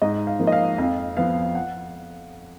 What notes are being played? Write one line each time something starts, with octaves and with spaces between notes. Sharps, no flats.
G#2 D#5
F5
F3 A#3
D#5
F5
F2 F5
F3 B3 F5
F#5